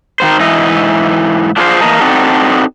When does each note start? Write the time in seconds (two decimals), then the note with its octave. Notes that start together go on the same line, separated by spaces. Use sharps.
0.20 D#3 G3 C5
0.40 G#2 E3 E4 D#5
1.57 D4 F4 G#4 A#4 C5
1.81 E3 A#3 A#4 D#5 A5
2.00 C4 D4 D#4 F#4 A4